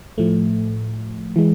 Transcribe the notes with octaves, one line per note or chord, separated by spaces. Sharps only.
A2 F3 A3
E3 G#3